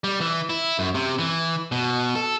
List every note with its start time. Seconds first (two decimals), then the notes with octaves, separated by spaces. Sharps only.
0.04 G3
0.21 E3
0.50 E4
0.79 F#2
0.95 C3
1.19 E3
1.72 B2
2.15 A4